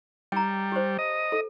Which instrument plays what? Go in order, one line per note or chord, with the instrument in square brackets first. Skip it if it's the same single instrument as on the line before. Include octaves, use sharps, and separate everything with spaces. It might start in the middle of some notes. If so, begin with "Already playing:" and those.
[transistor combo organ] G3 [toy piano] G5 A#5
[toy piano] G4 C5
[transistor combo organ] D#5
[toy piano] A4